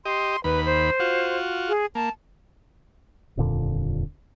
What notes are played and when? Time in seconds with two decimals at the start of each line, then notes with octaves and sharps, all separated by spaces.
0.05 G4 D#5 C6
0.44 D#2 B4 B5
0.65 C5
1.00 F4 F#4
1.69 G#4
1.95 A#3 A5
3.37 D#1 F2 A#2 D3